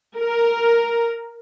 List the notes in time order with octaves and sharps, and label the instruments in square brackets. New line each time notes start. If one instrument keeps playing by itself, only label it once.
[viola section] A#4